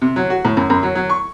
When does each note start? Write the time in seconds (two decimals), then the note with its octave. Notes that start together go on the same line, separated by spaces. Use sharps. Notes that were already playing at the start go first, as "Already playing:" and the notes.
0.02 C3
0.16 F#3
0.30 F#4
0.45 A2
0.57 F#2
0.70 F#2
0.83 F#3
0.95 F#3
1.10 C#6